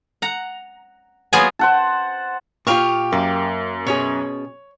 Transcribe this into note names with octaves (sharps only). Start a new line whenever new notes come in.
F#5 A#5
F#3 A#3 B3 F4 G#4 G#5
C5 F#5 A5
A#2 F4 G4 F5 C#6
F#2 A#3
B2 C#4 G#4 C#5